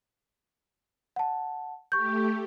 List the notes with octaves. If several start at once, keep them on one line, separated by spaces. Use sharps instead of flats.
F#5 A5
A3 G4 C#6 G6